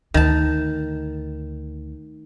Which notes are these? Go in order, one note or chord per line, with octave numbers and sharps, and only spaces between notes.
D2 D#3 A5